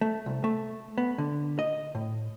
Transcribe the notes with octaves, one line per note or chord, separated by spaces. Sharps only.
A3
C2
A3
B3
D3
D#5
A2